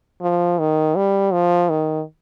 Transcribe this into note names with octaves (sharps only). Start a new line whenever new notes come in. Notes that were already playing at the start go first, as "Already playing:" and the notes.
F3
D#3
G3
F3
D#3